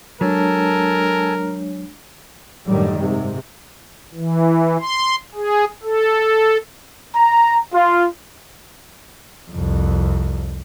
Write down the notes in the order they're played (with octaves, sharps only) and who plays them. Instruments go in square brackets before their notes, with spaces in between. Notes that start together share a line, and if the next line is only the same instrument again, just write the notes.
[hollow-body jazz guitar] F#3 [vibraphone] G#3 D4 C#5 [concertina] A4 G#5 A5 [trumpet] A#4
[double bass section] F#2 A2 D3 D#3 G3
G#2 C3
[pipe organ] E3
C6
G#4
A4
[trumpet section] A#5
F4
[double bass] C2 F2